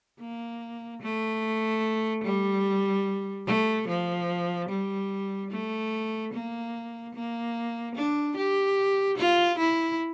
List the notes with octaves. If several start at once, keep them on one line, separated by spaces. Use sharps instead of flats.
A#3
A3
G3
A3
F3
G3
A3
A#3
A#3
D4
G4
F4
E4